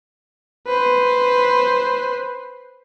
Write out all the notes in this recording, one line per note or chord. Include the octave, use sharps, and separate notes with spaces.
B4 C5